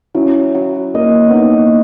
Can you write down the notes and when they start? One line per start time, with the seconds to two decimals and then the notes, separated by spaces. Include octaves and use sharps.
0.14 F#3 C#4 E4
0.55 F#3
0.94 A#3 D#5
1.29 B3
1.33 A#3 D#4